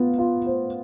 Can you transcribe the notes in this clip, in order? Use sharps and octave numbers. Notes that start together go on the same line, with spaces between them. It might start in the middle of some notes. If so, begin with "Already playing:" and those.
Already playing: B3 F4
F4
C5